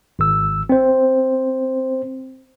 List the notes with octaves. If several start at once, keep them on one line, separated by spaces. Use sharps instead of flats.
G#1 E6
C4 C5